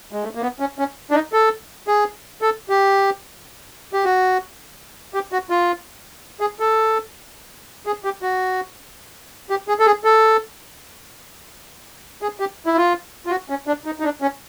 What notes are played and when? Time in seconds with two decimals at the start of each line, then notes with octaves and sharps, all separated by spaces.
0.12 G#3
0.24 A3
0.35 A#3
0.42 B3
0.60 C#4
0.79 C#4
1.11 D4
1.14 D#4
1.33 A4
1.88 G#4
2.42 A4
2.69 G4
3.93 G4
4.05 F#4
5.14 G4
5.32 F#4
5.50 F4
6.40 G#4
6.60 A4
7.86 G#4
8.04 G4
8.22 F#4
9.50 G4
9.68 G#4
9.79 A4
9.86 G#4
10.04 A4
12.22 G#4
12.40 G4
12.66 E4
12.77 F4
13.26 F4
13.30 F#4
13.49 C#4
13.67 D4
13.85 D#4
14.00 D#4
14.04 D4
14.22 C#4